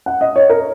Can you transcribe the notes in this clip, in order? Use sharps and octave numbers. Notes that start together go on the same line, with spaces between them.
F#5
D#5
C#5
A#4